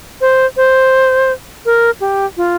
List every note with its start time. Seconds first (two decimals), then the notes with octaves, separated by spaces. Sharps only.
0.21 C5
0.57 C5
1.65 A#4
2.00 G4
2.37 F4